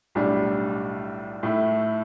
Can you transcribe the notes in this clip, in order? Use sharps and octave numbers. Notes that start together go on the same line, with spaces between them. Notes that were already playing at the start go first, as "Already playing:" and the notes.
B1 A2 G3 D4
A2 A3 E4